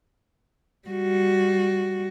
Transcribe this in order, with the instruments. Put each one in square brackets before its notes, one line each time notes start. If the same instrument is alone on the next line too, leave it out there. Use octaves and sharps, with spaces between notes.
[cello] G3 F#4